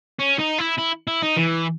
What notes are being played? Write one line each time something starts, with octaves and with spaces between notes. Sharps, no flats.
C#4
D#4
E4
E4
E4
D#4
E3